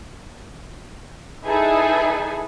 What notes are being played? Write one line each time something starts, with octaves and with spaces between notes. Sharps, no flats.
D#4 E4 G#4 A4 B4 G#5